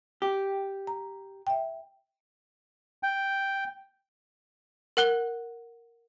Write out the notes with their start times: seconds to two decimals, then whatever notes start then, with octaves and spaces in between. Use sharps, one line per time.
0.22 G4
0.87 A#5
1.47 E5 G5
3.03 G5
4.97 A#4 F#5 F#6 G7